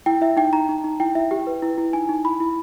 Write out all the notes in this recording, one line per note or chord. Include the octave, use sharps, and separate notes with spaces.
E4 G5
E4 E5
D#4 G5
D#4 A#5
D#4
D#4
E4 G5
E4 E5
G4 G5
B4
E4
E4
D#4 G#5
D#4
E4 B5
E4